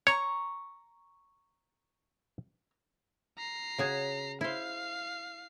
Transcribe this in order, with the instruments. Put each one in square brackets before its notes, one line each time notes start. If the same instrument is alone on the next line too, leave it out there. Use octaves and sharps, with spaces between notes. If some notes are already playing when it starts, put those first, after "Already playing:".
[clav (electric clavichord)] C#5 [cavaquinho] A#5 C#6
[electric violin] A#5 C7
[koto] C#3 F#4 G#4
[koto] E4 C5 [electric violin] F5 C7